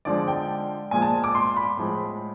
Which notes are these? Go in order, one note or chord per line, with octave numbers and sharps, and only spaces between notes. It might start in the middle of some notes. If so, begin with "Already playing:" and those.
D3 F3 G#3 D5
G5
A#2 F3 G#3 G#5
A5
D6
C6
B5
A2 F3 G#3